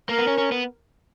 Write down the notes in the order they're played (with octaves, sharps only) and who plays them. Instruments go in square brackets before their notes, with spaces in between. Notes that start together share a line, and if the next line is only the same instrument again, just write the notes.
[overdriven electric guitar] A#3 [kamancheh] A#4
[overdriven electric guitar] B3
C#4
C#4
B3